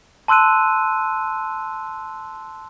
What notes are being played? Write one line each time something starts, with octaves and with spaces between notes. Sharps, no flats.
A5 C6 E6 F#6 D#7